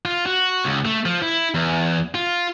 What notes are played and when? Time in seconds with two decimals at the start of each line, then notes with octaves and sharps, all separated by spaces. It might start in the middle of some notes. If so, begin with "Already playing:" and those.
0.05 F4
0.26 F#4
0.65 C#2
0.85 A3
1.05 F3
1.22 E4
1.54 E2
2.15 F4